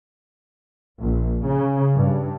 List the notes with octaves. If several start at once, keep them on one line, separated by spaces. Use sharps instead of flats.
A#1
C#3
G2